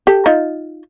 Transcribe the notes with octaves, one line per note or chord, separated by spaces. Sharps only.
G4 A4
D#4 F4